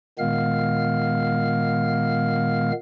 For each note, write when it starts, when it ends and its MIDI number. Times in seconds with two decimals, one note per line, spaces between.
0.19 2.72 46
0.19 2.72 51
0.19 2.72 56
0.19 2.72 59
0.19 2.72 77
0.19 2.72 89